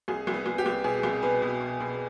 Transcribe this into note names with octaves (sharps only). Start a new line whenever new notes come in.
C2 G#4
C2
B3 B4
C2
G4
C2
B2 G#4
C2
B2 B3 B4
B2
B2
B2